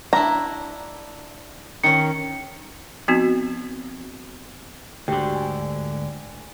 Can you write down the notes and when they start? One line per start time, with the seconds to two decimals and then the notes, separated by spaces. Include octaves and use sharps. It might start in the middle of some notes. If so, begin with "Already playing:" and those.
0.13 D4 E4 A#5
1.84 D#3 C#4 C#7
3.08 F3 B3 C4 D#4 F#4
5.08 D2 G#2 D3 F#4 G4 G5
5.36 G#5